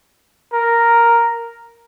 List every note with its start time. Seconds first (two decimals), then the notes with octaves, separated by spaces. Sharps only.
0.53 A#4